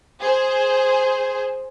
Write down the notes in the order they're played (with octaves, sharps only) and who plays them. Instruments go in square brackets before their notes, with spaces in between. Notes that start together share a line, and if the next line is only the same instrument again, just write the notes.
[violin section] G#4 C5